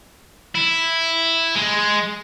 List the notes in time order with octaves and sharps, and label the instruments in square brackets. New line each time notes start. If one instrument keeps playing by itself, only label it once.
[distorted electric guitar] E4
G#3